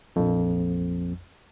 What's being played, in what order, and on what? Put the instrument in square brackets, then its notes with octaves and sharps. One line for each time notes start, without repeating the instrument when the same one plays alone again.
[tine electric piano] A#1 F2